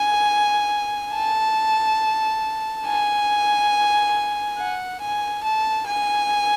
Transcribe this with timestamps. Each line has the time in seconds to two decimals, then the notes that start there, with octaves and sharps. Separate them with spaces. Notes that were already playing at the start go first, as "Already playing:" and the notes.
Already playing: G#5
1.14 A5
2.86 G#5
4.58 F#5
5.01 G#5
5.44 A5
5.87 G#5